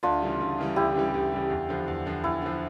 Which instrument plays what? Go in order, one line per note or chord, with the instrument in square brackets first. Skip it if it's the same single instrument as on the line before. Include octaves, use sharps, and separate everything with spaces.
[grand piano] D2 [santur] D4 F4
[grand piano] C#3 E3 G3
D2
C#3 E3 G3
[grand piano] D2 [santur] E4 G4
[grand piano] C#3 E3 G3
D2
C#3 E3 G3
E2
D3 F3
E2
D3 F3
[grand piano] E2 [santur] E4
[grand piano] D3 F3